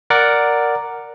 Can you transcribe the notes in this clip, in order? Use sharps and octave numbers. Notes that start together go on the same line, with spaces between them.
A#4 D5 F#5 D6